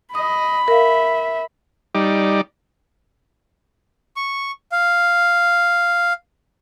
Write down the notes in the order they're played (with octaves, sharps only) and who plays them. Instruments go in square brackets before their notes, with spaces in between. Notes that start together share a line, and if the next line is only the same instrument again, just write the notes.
[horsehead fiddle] D#5 [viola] B5 [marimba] D#6
[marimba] A#4 F5 [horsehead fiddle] E5
[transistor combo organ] G3 D#4 D5
[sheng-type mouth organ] C#6
F5